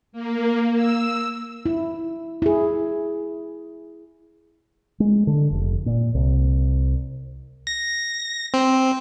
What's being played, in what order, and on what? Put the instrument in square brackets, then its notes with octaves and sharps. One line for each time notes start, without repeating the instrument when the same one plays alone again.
[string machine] A#3
E6
[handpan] E4
E4 G#4
[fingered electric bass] G#3
D3
F1
A#2
C2
[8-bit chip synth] A#6
C4